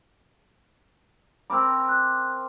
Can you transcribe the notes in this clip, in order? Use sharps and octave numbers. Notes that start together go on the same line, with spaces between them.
C4 A#4 B5 D6 E6
F#6